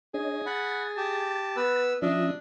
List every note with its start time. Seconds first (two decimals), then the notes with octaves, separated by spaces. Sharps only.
0.14 D4 G#4 C#5 D#5
0.46 F#5 B5 A6
0.97 G4 A5
1.57 B3 B4 E6
2.02 F3 C#4 D4 F4 D#5 E5